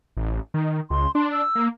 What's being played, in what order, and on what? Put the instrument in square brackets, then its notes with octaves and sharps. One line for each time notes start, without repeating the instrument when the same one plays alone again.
[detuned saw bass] A1
D#3
[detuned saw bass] C#2 [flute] C6
[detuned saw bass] D4 [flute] C6
[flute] E6
[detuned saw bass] A#3